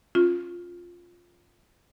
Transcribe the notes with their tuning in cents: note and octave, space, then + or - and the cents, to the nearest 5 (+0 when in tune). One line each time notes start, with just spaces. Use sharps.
C#4 -25 F4 +0